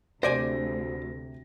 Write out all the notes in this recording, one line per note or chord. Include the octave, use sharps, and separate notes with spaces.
D2 C3 C5 D5 G#5 A#6